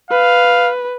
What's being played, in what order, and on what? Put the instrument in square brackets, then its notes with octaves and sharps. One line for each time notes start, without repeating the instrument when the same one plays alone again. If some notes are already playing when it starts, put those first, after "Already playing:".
[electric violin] B4 [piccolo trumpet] F5